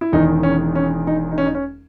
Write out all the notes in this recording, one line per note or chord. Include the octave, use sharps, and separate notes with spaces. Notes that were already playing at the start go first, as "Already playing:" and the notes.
E4
E1 E2 D#3 D#4
C#4
C#4
D#4
D#4
C#4
D#4
C#4